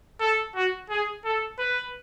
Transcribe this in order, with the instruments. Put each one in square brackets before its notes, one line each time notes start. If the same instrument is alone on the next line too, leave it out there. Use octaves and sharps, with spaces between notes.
[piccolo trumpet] A4
F#4
G#4
A4
B4